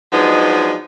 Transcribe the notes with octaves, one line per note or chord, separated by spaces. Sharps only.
F3 F#3 G#3 B3 D4 D#4